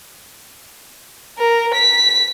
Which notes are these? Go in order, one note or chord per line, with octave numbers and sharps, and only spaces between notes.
A#4
B6